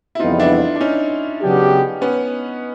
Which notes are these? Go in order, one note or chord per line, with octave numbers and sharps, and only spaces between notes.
E4
F2 C#3 E3 G3 B3 D#4 F4
D4 E4
D4
C#4 D#4
C#3 F#3 B3 D4 G4
B3 C#4